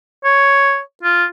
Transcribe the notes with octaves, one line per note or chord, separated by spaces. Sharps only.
C#5
F4